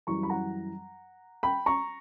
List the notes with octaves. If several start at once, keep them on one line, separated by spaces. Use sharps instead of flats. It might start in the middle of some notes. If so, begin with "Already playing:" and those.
F#2 E3 G3 A#5 C#6
B5
F#5 A#5
G5 B5
A#5 C#6